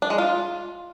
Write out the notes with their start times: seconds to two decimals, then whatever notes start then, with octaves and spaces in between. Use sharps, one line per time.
0.02 D4
0.10 G#3
0.18 F4